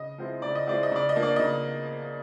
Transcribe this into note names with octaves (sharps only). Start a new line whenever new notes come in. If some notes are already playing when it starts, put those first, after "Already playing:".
Already playing: C#3 D#5
F3 G#3 C4 E4
C#3 D5
D#5
F3 G#3 C4 E4 D5
D#5
C#3 D5
D#5
F3 A#3 D4
D5
C#3 D#5